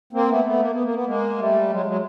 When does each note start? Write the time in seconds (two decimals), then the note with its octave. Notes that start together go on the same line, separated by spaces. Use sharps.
0.13 A#3 C4
0.29 A3 B3
0.44 A3 B3
0.60 A#3
0.72 B3
0.83 A#3
0.94 B3
1.06 G#3 A#3
1.38 G3 A3
1.70 F#3 G#3
1.86 F#3 G#3